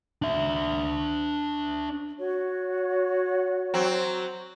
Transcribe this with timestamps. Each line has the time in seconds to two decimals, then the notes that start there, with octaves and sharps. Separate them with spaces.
0.22 D4 E5
2.18 F#4 C#5
3.74 F#3 C4